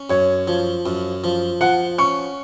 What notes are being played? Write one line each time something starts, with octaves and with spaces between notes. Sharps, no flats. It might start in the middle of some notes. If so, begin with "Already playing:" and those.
Already playing: C#4
F#2 C#5
F3
F#2
F3
F3 F#5
C#4 C#6